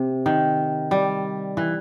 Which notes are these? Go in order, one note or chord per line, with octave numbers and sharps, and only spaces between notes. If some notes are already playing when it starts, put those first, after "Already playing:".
Already playing: C3
D#3
G3
E3